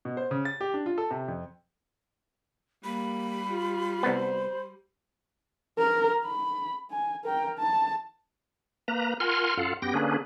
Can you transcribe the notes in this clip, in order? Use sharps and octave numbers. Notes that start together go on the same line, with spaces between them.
B2
C5
C#3
A6
G4
D4
F4
A4
C3
F2
G3 A#3 B5
F4
C2 B3 C5
A#4
B5
G#5
A#4 G5
A5
A#3 B4 A#5
F4 A#4 F#5 G#5 C6 F6
F#2 F4 A4 F5 F#5
F#2 B3 G4 G5 A#6
D3 A#3 C#4 D4 G#4 B4